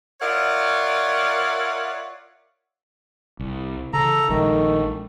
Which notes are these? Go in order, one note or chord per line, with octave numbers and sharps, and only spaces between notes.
F4 A#4 C#5 D5 E5 F#5
C2
C#3 E3 A4 A#5
A#1 D#3 F3 G#3 A3